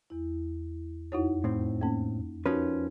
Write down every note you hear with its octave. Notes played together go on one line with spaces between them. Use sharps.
E2 E4
F2 D#4 E4 F#4 C#5 F#5
A2 C4
A#3 C#4
F3 C#4 D#4 F#4 A#4 B4